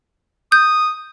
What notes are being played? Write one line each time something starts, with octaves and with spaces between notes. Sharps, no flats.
D#6 G6